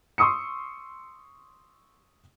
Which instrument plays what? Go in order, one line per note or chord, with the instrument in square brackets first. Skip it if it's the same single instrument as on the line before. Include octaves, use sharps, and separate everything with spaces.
[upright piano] C6 C#6 D#6 E6 C#7